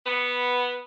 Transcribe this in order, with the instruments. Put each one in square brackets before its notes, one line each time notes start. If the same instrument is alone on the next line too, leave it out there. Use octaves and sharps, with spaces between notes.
[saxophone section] B3